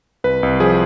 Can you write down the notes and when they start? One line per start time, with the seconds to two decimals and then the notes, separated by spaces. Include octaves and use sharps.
0.24 C2 B4
0.43 C2
0.60 F3 G#4